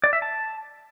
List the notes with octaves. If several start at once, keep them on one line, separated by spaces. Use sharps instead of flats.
D5
E5
A5